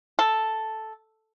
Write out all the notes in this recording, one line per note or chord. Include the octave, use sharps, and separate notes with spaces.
A4